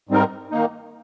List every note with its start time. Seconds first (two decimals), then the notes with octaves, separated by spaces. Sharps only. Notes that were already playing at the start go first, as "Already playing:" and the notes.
0.09 G#2 G3 C4 D#4 A#4
0.51 D#3 A#3 D#4